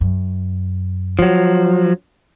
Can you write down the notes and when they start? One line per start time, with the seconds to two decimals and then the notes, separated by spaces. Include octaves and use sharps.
0.01 F#2
1.19 F3 F#3 D4